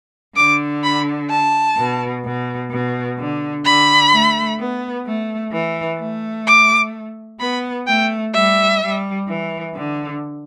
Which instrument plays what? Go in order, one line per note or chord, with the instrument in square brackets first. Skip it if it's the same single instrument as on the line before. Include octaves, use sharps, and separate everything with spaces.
[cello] D3 [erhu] D6
[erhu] B5
A5
[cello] B2
B2
B2
D3
[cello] D3 [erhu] B5
[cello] A3
B3
A3
E3
A3
[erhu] D6
[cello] B3 [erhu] B5
[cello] A3 [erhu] G5
[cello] G3 [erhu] E5
[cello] G3
E3
D3